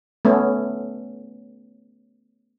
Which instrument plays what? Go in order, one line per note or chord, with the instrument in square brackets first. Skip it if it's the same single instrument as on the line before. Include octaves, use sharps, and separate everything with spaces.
[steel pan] A3 B3 C#4